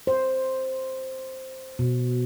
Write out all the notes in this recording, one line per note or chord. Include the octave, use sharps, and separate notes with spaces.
C5
B2